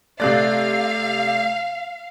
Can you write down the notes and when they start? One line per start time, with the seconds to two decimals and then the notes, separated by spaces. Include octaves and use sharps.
0.20 C3 A3 D5 F5 F#6 A6